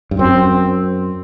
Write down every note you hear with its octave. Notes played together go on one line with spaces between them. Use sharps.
G2
F#2 C4